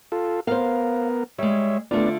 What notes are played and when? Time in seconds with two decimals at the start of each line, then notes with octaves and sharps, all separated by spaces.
0.12 F4 A4
0.47 B3 A#4 C5 F5
1.39 G3 G#3 C#5 E5
1.91 D3 A3 B3 D4 F4 D5